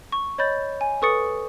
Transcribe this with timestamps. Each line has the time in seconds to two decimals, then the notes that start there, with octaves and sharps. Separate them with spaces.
0.12 C#6
0.38 C#5 D#5 B5 G6 A6
0.81 G#5
1.02 A4 B4 C#6 D#6 A6 C#7